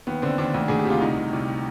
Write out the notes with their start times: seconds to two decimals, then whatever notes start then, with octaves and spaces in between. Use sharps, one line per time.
0.07 D#2 B3
0.22 D3 C4
0.38 D#2 D4
0.54 D2
0.68 D2 G#4
0.79 G4
0.85 C3 F4
1.01 C2 D#4
1.17 C2
1.33 C2